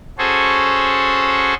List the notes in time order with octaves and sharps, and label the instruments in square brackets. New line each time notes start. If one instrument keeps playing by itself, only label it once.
[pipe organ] C#4 F#4 G#4 A4 C5 C#5